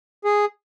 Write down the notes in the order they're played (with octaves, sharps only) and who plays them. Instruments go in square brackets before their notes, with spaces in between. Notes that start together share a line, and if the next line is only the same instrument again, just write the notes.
[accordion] G#4